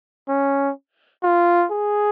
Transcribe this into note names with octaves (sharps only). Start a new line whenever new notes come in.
C#4
F4
G#4